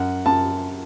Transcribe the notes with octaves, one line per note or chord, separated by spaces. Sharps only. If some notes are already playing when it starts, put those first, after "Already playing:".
Already playing: F#2 F#5
F#2 A5